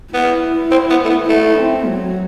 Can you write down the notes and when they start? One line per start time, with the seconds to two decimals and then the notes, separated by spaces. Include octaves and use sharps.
0.14 B3 E4
0.71 C4
0.90 B3
1.05 A3
1.10 B3
1.29 A3 E4
1.58 C4
1.86 F#3